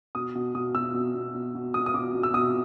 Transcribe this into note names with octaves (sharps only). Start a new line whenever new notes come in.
B2 D#6
B2
B2 D#6
B2 E6
B2
B2
B2
B2
B2 D#6
D#6
B2 D6
B2
E6
B2 D#6